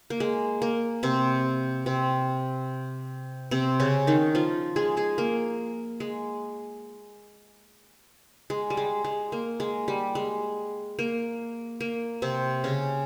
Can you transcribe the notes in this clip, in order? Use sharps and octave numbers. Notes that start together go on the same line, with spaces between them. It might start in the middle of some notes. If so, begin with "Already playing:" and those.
A#3
G#3
A#3
C3 C4
C3 C4
C3 C4
C#3 C#4
D#3 D#4
F3 F4
G#3 G#4
G#3 G#4
A#3
G#3
G#3
G3
G#3
G#3
A#3
G#3
G3
G#3
A#3
A#3
C3 C4
C#3 C#4